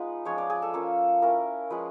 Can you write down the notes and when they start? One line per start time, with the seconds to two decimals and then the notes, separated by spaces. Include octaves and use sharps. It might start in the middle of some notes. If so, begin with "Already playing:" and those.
Already playing: G#3 B3 D#4 F4 B4
0.25 F3 G#3 C#4 C#5
0.38 D5
0.50 G#4
0.62 A4
0.74 A#3 C#4 F4 A4
1.22 A#3 C#4 E4 A#4
1.70 F3 G#3 C#4 B4